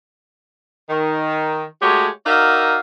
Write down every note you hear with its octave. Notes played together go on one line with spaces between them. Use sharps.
D#3
G#3 A3 F#4 G4 C#5
D#4 F#4 A#4 D5 E5 F5